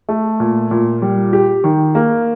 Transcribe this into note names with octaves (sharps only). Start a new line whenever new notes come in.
A3
A#2
A#2
G3
G4
D#3
A#3